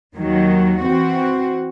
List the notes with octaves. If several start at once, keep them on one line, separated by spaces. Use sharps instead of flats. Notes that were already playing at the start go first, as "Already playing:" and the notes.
D#2 D#3 F#3
E3 C4 F#4